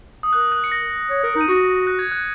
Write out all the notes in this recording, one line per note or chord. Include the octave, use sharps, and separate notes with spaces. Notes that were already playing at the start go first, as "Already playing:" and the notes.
D#6
A#4 F#6
F#6
C#7
A#6
C#5
A#4
D#4
D#7
F#4 C#7
F#6
G#6
F#6